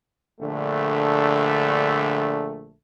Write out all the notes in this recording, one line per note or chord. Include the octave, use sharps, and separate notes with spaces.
A#1 D3 A3